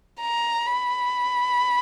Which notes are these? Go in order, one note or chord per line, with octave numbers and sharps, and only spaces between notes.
A#5
B5